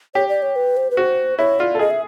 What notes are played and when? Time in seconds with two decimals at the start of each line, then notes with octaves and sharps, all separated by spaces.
0.15 G4 C#5
0.29 D5
0.42 C#5
0.56 B4
0.77 C5
0.91 B4
0.97 F#4 C5
1.38 E4 C#5
1.59 F4 D5
1.75 A4
1.79 G#4 D#5
1.91 E5